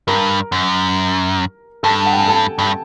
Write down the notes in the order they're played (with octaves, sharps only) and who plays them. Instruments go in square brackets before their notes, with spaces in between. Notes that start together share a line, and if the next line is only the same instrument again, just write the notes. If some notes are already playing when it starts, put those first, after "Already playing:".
[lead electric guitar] G2 [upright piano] A#4 A#5
[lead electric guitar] F#2
[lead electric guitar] G2 [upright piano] A4 A5
[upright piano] F#5
G5
G#5
A4 A5
[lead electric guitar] G2 [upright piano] A5